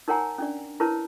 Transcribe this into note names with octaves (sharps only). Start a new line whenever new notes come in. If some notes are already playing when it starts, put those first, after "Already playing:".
D#4 A#4 C#5 F#5 G#5 A#5
C#4 D4 D5
E4 A#4 B4 C#5 A5